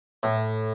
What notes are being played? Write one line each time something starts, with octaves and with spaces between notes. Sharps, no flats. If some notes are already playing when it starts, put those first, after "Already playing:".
A2